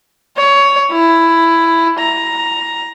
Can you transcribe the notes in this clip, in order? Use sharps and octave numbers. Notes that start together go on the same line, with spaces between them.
C#5
E4
A#5